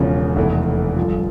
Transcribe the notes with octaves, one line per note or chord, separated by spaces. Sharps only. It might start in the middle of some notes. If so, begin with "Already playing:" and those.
Already playing: E1 E2 C#3 F3 C#4
F1 E2 E3 A3 E4
G1 G2 F3